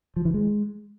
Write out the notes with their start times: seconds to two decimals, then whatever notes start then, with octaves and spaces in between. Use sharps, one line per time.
0.16 F3
0.25 E3
0.34 G#3